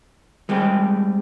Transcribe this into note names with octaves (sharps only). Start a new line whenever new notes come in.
G3 G#3 C4 G4